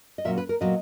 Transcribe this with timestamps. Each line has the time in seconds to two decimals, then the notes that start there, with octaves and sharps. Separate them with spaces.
0.18 D#5
0.25 A#2 F#3 C#4 E5
0.38 B4
0.49 A#4
0.60 A#2 F#3 B3 D#5